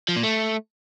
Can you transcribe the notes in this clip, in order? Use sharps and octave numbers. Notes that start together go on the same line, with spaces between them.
F3
A#2
A3